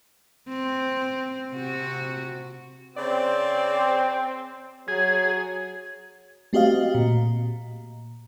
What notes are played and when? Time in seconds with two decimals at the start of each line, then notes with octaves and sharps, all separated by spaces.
0.48 C4
1.54 C3 F#4
2.97 C#3 C4 C5 D5
4.88 F#3 G#4
6.53 A3 C4 F#4 G4 D#5 F5
6.94 A#2